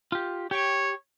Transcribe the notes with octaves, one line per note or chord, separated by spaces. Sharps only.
F4 G4
G4 C#5 G5